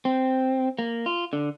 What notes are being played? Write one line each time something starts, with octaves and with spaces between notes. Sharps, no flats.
C4
A#3
F4
D3